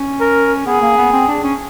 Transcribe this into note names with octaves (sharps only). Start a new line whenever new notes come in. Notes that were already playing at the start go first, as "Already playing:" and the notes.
Already playing: C#4
A#4
B3 G#4
A#3
B3
C4
D4
C#4